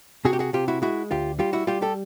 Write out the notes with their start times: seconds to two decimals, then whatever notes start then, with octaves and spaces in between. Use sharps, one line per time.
0.25 C3 F#4 G#4
0.33 G4
0.39 F#4 G#4
0.53 C3 F4 G4
0.68 E4 F#4
0.82 G#3 E4 F#4
1.11 D2 F4 G4
1.39 G3 F4 G4
1.53 E4 F#4
1.67 G3 F4 G4
1.82 G4 A4